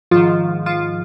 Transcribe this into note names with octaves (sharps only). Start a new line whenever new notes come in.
G#2 D#3 F3 F4
F3 F4